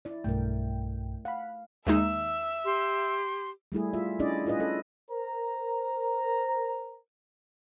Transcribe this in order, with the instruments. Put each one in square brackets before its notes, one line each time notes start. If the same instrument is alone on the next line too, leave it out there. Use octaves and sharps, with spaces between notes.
[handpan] E4 D5
[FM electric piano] B1 G2 G5 [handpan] A3 A#4
[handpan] F5 [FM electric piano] F#5 B5
[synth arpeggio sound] D#2 G#3 D#4 [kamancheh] E5 E6
[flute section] G4 C6
[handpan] G3 A3 E4 G#4
F4 E5
C#4 D4 E4 G#4 D5 D#5
E4 F4 G#4 B4 D#5
C#4 A4 D#5
[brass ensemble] A#4 C5 A#5